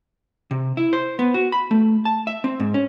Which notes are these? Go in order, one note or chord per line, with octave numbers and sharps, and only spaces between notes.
C3
E4
C5
B3
F#4
B5
A3
A5
E5
C4
G#2
C#4